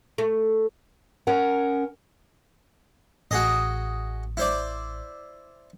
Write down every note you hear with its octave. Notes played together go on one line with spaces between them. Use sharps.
A3
C#4 A#4 F#5
A1 F#4 G#4 D#5
E4 C5 D5